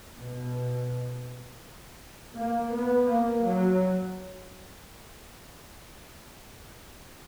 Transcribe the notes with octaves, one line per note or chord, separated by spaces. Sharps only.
B2
A#3
B3
A#3
F#3